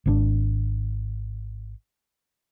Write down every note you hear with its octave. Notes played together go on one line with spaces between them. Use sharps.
G#1 B2 D4